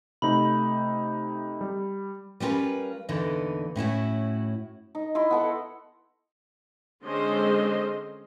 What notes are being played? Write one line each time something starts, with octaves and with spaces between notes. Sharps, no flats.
C3 A3 D#4 B5
G3
G3 B3 C#4 F4 A#4 B4
E2 A#2 D3 E3 D#4
A2 C#4 E4 F#4
D#4
E4 D#5 C6
B3 A4 F#5
D3 G#3 C4 C#4 C5 D#5